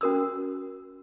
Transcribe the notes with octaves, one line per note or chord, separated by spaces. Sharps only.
C#4 F#4 A#4 D#6 E6